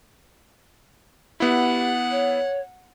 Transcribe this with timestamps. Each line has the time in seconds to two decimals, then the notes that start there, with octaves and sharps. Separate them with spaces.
1.40 B3 E4 G4 F#5
2.11 C#5